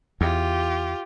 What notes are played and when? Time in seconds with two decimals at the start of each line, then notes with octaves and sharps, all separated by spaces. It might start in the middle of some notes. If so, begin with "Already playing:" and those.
0.21 E2 F4 G4